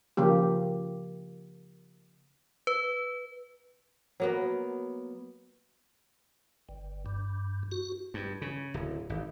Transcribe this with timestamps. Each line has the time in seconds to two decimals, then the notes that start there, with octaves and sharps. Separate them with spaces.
0.17 C#3 F3 A#3 G4
2.67 B4
4.20 F#3 A#3 B3
6.69 G1
7.06 G2
7.72 F#4
8.14 G2
8.42 C#3
8.74 D1
9.10 G#1